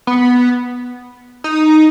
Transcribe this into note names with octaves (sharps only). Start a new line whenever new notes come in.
B3
D#4